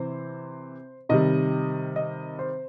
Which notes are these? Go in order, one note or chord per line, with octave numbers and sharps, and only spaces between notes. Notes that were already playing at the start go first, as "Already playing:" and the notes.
Already playing: C3 E3 C5
C3 D#3 G3 D#5
D#5
C5